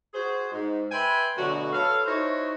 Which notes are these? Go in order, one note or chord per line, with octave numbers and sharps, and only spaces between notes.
F#4 G#4 C5
G#2
B4 E5 G5 G#5 B5 C6
B2 D3 F#3 A3 F#4
A4 B4 C#5 F5
D#4 E4 F#4 C5 C#5